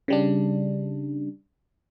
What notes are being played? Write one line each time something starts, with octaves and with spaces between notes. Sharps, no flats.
C#3 G3 D4